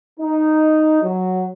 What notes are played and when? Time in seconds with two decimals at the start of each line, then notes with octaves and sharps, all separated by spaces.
0.20 D#4
1.03 F#3